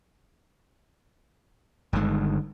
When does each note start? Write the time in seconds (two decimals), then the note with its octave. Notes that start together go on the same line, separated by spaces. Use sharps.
1.93 G1 D3 D#3 G#3